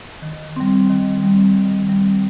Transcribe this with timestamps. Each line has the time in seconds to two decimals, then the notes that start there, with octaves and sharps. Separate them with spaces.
0.22 D#3
0.56 G3 C4
0.90 D#3
1.23 G3 C4
1.56 D#3
1.89 G3 C4